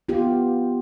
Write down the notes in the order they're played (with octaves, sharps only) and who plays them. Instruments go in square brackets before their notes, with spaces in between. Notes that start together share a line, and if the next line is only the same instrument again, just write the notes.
[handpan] B3 F4 G4